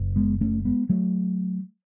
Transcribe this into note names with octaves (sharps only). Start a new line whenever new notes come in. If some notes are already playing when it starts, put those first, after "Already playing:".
Already playing: F#1
G#3 B3
A3 C#4
G#3 B3
F#3 A3